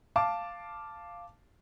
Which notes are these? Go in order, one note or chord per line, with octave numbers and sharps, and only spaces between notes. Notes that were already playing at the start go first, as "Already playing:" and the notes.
F5 A5 D6